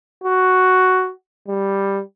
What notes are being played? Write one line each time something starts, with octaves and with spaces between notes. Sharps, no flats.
F#4
G3